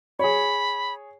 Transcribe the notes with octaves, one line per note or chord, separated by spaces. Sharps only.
G#4 C#5 B5